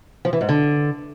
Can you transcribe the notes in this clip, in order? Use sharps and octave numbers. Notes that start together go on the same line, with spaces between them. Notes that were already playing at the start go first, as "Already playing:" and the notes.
F3
E3
G#2
D3